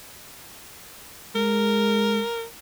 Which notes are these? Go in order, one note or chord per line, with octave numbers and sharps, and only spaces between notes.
G#3 A#4